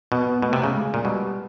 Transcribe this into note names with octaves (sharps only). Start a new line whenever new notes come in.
B2 B3
B2 A3
C3
C#3
G#3
A#2
B2 G3